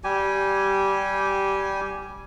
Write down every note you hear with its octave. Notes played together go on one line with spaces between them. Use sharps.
G3 G4 G#5